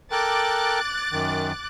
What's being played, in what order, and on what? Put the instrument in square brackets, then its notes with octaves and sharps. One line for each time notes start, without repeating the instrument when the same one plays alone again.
[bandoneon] A4 A#4 G5 [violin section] D6 F#6 A6
[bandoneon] F#2 D#3